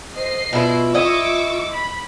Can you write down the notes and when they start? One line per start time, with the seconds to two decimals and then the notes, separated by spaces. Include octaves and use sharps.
0.16 C5 D#5 C7
0.53 B2 E4 F4
0.94 E4 D#5 C#6 D6 E6
1.72 B5